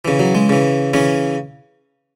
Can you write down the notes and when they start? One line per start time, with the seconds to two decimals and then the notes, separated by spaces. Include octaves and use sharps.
0.05 C#3 E3
0.19 F#3
0.35 G#3
0.49 C#3 E3
0.93 C#3 E3 C#4